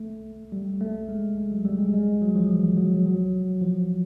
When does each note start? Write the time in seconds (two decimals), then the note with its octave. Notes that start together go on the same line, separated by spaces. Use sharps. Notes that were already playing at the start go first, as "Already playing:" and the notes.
Already playing: A3
0.52 G3
0.81 A3
1.09 G#3
1.38 G#3
1.52 F#3
1.65 G3
1.79 G#3
1.94 G#3
2.08 G3
2.22 F#3
2.35 F3
2.50 E3
2.64 F3
2.77 F#3
2.92 F3
3.06 F#3
3.62 F3